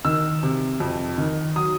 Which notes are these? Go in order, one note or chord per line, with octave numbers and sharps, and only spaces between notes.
D#3 E6
C3
F2
D#3
F#3 D#6